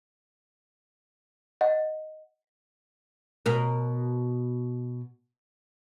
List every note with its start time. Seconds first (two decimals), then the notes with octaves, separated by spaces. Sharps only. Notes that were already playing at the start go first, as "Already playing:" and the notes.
1.61 D#5 F#5
3.46 B2 A#4